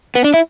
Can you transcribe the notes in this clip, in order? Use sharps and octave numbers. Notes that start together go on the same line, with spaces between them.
B3
D4
E4